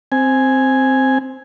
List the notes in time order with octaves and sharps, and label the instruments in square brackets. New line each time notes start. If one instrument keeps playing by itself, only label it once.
[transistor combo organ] C4 G#5